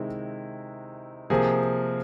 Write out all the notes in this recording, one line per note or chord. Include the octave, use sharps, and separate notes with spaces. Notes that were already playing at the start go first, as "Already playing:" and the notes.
Already playing: C3 D#3 G#3 C4 E4
C3 F3 A#3 G#4